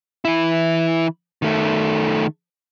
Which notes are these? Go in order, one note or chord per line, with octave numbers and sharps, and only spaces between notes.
E3 E4
D#3 A3